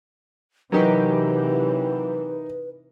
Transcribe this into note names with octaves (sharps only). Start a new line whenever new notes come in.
C3 E3 F#3 D#4 G4 A#4 B4